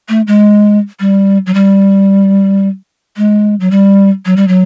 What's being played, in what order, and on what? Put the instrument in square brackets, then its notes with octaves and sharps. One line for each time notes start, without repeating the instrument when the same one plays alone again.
[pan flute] A3
G#3
G3
F#3
G3
G#3
F#3
G3
F#3
G3
F#3